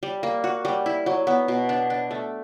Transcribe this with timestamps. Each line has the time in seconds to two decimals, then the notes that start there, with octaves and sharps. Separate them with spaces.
0.03 G3
0.23 A#3
0.44 F#4
0.65 G3
0.86 E4
1.06 F#3
1.27 B3
1.48 B2
1.69 D4
1.90 D4
2.11 A3